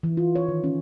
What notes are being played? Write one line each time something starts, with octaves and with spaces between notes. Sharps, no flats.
E3
F4
C#5
D#3
C#4